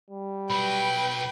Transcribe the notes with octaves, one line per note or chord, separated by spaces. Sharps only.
G3
B1 F#3 B4 G5 B5